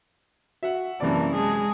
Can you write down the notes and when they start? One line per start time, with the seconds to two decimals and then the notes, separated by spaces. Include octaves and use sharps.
0.63 F#4 E5 F#5
1.00 F#2 C3 E3 A#3 D5 A5
1.34 G#3 G#4